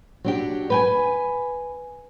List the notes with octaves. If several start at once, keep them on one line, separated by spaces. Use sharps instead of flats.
F#3 D4 G4
B4 G5 G#5